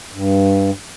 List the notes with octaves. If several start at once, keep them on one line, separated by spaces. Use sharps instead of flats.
G2